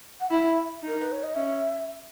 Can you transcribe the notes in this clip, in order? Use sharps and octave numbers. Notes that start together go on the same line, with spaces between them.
F#5
E4 E5
D#4 A#4
B4
C#5
D#5
C#4 E5